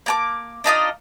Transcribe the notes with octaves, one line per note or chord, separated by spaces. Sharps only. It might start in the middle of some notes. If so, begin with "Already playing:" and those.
A#3 A5 D6
D4 D#4 F4 D#5